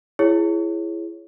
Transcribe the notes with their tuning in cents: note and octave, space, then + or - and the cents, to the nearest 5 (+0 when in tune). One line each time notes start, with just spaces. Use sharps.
E4 +25 G#4 +0 C#5 +0